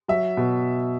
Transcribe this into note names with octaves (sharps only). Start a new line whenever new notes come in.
F#3 E5
B2